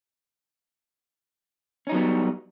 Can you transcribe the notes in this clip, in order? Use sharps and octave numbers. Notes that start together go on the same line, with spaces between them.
F#3 G3 B3 C#4 D#4